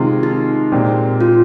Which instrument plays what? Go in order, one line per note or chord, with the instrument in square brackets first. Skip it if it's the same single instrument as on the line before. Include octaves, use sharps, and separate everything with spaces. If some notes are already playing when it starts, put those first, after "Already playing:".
Already playing: [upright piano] C3 D#3 G#3 C4 F4
[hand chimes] D#4
[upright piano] A#2 G#3 C4 G4
[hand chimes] F4